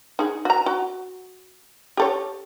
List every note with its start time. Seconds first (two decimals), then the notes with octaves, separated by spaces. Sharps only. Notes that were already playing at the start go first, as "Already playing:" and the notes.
0.19 D#4 G#4
0.45 F#4 A#5
0.66 F#4
1.97 G4 A4 C#5